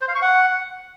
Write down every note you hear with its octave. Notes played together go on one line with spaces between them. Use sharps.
C5
F5
C#6
F#5